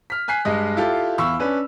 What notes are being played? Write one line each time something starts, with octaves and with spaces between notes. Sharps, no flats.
F6 B6
G#5 F#6 B6 C7
G2 G#3 D#5
E4 F4 G4 A4
E2 F5 B5 C#6 E6
C#4 D4 B4